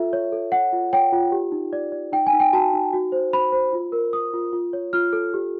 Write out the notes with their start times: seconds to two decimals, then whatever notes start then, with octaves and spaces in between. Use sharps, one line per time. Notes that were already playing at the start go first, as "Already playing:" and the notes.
Already playing: F4 A4 E5
0.13 C#5
0.32 A4
0.52 C#5 F#5
0.72 F4
0.93 C#5 G5
1.12 F4
1.32 G4
1.52 D#4
1.73 D5
1.92 D5
2.12 D#4 G5
2.27 G#5
2.33 D#4
2.40 G5
2.53 F#4 A5
2.73 D#4
2.93 F#4
3.12 C5
3.33 C5 B5
3.52 C5
3.73 F4
3.92 A#4
4.13 A#4 D#6
4.34 F4
4.53 F4
4.73 C#5
4.93 F4 F6
5.13 A4
5.34 G4